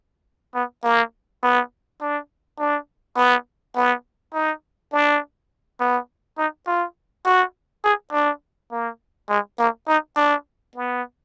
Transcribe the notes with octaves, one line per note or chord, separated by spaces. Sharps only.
B3
A#3
B3
D4
D4
B3
B3
D#4
D4
B3
D#4
F4
F#4
G#4
D4
A#3
G#3
A#3
D#4
D4
B3